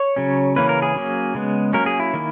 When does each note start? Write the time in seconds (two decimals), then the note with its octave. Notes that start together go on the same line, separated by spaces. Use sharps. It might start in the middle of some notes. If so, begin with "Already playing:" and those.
Already playing: C#5
0.16 C#3 F#3 C#4
0.56 C#3 E3 A#3 C#4 B4
0.69 A#4
0.82 G#4
0.95 F#3 A#3 C#4
1.35 C#3 G#3 B3
1.73 F#3 A#3 C#4 A#4
1.86 G#4
2.00 E4
2.14 D#3 A#3